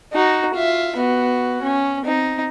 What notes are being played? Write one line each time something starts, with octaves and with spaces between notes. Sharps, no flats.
D#4 F#4
F4 E5
B3 F#4
C#4
C4 D#4